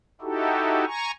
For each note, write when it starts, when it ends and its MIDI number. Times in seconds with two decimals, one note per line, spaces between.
0.21 0.85 63
0.21 0.85 64
0.21 0.85 66
0.21 0.85 67
0.21 0.85 69
0.86 1.11 80
0.86 1.11 82
0.86 1.11 85